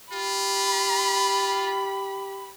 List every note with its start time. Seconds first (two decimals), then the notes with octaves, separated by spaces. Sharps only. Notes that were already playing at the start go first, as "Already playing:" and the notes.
0.12 F4 G4 B5